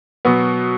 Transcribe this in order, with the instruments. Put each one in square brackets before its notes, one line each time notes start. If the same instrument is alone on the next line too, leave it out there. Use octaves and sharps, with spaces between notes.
[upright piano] B2 F#3 B3